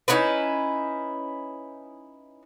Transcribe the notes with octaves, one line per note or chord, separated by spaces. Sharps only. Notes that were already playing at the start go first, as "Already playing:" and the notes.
C#4 D#4 E4 B4